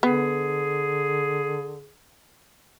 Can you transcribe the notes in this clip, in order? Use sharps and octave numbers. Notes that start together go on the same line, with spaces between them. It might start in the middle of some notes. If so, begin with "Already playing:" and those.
D3 B3 G#4